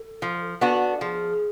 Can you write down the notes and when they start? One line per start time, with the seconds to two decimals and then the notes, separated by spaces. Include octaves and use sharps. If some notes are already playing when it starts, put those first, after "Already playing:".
Already playing: A4
0.22 F3
0.61 B3 D4 F#4
1.01 F3 G#4